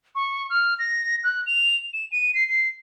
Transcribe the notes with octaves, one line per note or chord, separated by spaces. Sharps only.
C#6
F6
A#6
F#6
F7
E7
D#7
C7
C7